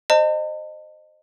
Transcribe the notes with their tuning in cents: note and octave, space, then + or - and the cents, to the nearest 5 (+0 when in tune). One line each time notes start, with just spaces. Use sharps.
C5 +0 D#5 -20 A5 +40